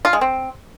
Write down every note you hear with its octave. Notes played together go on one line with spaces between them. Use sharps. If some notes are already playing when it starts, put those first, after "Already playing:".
F4
G#3
C4